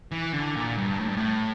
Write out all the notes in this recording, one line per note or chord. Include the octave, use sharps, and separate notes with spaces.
E3
D3
A#2
G2
A2
G2
A2